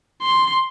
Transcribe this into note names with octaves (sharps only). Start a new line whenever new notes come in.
C6